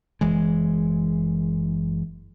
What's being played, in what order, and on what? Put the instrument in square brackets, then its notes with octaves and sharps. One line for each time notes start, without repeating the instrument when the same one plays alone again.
[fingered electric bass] F#1 E3 G#3